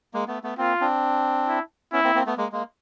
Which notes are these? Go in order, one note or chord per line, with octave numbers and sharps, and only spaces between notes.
G#3 A#3
A3 B3
A3 B3
A#3 C4 F4
C4 D4
E4
B3 C#4 E4
A#3 C4
A#3 C4
A3 B3
G#3 A#3
G#3 A#3